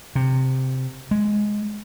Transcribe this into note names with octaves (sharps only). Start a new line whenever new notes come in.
C3
G#3